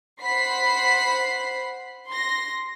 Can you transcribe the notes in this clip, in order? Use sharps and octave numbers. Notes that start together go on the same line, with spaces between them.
C5 F#5 B5 B6 C7
C6 A#6